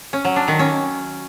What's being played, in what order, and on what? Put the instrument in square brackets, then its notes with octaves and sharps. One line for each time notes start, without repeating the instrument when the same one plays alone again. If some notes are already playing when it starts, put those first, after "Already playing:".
[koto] C#4
F#3
D4
D#3
C#4